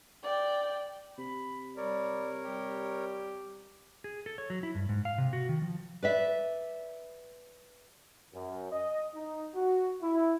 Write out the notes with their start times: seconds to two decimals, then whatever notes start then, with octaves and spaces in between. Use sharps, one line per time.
0.23 D5 G5
1.18 C3 B5
1.77 G3 A#4 C#5 D5
2.43 G3 G4
4.04 G#4
4.26 A4
4.38 C#5
4.50 F#3
4.63 E4
4.75 G2
4.89 G#2
5.05 F5
5.18 C3
5.33 F#4
5.49 D#3
5.62 F3
6.03 B4 D5 E5
8.33 F#2
8.71 D#5
9.15 D#4
9.54 F#4
10.02 E4